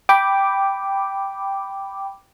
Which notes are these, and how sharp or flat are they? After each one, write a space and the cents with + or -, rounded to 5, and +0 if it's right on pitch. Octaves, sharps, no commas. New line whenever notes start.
G5 +0 B5 +0 D6 +0